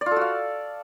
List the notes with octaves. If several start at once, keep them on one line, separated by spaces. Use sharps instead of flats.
D5
F4
A4
F#4
F5